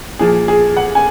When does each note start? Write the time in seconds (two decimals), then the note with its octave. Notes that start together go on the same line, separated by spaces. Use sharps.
0.19 A#2 F3 G#4
0.48 G#4
0.77 F#5
0.95 G#5